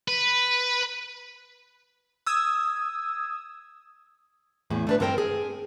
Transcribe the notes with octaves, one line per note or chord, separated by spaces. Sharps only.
B4
D#6 E6 G#6
E2 A2 G#4
A3 D4 B4
G2 C4 A4 A#4 C5 G5
G#4